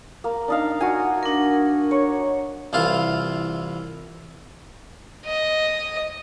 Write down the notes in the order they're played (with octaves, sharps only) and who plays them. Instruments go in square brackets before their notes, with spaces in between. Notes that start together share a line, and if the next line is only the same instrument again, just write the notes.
[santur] A#3
D4 D#4 F5
F#4 G#5
[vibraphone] D4 A#4
[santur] C#5
[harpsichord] C2 E3 F4 F5
[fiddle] D#5